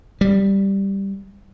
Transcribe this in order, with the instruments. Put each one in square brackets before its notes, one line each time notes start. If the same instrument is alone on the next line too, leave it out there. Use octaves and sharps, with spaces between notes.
[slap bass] G3